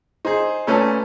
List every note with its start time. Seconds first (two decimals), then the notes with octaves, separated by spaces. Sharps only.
0.25 D#4 G#4 C5
0.67 A#2 A3 C#4 B4 A5